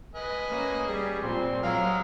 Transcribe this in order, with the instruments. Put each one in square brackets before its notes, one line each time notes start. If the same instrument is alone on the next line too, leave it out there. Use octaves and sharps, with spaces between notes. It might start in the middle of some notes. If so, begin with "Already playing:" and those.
[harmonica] B4 D#5 G#5
[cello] A#3 [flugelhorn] C#4
[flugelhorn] G3 [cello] G#4
[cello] A#2 [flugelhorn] C4 [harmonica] C6
[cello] F#3 [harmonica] G#3 A#4 E6 [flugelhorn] F5